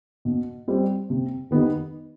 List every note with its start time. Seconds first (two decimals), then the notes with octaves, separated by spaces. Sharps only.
0.25 B2
0.68 G3 C4
1.10 C3
1.51 D#3 B3 D#4 G4